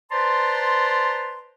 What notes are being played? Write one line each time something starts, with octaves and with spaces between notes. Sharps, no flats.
B4 C5 D5 A5 A#5 C6